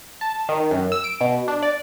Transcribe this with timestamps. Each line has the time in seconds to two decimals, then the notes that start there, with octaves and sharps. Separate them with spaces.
0.21 A5
0.49 D#3
0.71 F#2
0.92 E6
1.04 D7
1.21 B2
1.48 D4
1.63 D5